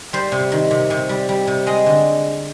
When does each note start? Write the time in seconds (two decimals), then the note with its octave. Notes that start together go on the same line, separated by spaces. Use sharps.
0.13 G3 C5
0.32 C3
0.52 D#3
0.71 C3
0.90 C3
1.09 G3
1.29 G3
1.47 C3
1.67 G#3 D#5
1.86 D3